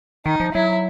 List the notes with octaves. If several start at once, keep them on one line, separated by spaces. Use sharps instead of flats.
D#3 D#4
F3
F#3 E4